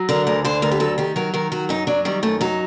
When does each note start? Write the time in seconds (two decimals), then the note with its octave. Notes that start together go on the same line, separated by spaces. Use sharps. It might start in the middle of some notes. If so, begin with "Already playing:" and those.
Already playing: F#3
0.09 D3 A#4
0.27 D2 A#4
0.45 D3 C5
0.62 D2 A#4
0.71 G4
0.80 F#3 A4
0.98 D#3 G4
1.16 F#3 A#4
1.34 D#3 A#4
1.52 F#3 F#4
1.69 F#2 D#4
1.87 F#3 D4
2.05 D#3 G3
2.23 F#2 A3
2.41 F#3 D#4